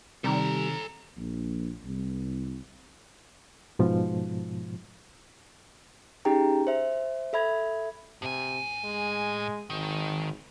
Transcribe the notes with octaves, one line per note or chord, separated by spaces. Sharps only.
C3 D#3 G3 A4 A#5
A#1
C2
G#2 B2 F3
C#4 D#4 G4 G#4 G5 A#5
C5 E5
A4 E5 B5 G#6
A2 C3 G#5
G#3
G#1 D#3